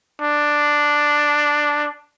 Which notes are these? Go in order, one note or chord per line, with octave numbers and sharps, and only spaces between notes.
D4